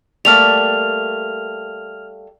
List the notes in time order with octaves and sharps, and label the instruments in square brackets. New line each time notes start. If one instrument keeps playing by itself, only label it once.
[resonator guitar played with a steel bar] G3 A3 A#3 [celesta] F6 F7